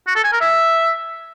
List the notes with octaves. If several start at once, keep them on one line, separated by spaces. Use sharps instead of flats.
F#4
A4
G#5
A#4
E5